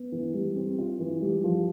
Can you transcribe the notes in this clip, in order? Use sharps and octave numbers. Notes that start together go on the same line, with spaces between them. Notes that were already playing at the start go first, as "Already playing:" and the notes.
Already playing: B3
E3
G3
C4
F4
E3
G3
F3